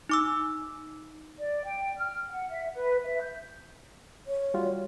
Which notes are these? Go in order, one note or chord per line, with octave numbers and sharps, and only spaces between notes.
D#4 D6 E6
D5
G5
F6
F#5
E5
B4
E5
G6
C#5
G3 F4 F#4